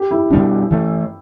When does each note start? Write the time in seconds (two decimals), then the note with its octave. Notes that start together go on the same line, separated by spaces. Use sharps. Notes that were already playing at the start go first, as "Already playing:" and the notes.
Already playing: G4
0.11 E4
0.30 B2 G3 D4
0.70 E3 A3